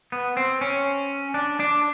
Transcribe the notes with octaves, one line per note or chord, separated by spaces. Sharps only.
B3
C4
C#4
D4
D4